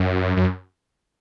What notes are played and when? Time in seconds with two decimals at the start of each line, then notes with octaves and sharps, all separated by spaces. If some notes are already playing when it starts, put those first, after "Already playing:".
Already playing: F#2
0.37 F#2